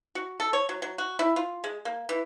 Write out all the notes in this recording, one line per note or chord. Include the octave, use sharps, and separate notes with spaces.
F#4
A4
C#5
F#3
F#3
F#4
E4
F4
G#3
A#3
E3